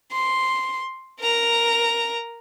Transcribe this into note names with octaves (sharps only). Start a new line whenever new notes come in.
C6
A#4 A#5